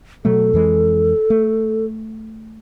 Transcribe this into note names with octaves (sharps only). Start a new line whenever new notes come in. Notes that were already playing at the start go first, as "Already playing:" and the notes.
B2 F#3 A3 A4
F2 E3 G#3
A3